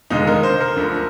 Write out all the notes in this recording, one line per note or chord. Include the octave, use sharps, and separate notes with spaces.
F1 D#2 D3 G#3 D#4
A#4
C5
A#4
D2 D3 F3